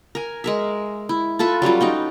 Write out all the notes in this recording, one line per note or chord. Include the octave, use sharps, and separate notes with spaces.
A#4 G#5
G#3 A#4 E5
E4
F4 A4 B4 E5
F#3 G3 C#4 F4
D#4 F#4 G5